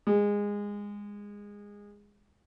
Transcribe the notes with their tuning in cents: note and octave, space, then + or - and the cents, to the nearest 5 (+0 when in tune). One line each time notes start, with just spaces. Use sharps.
G#3 -20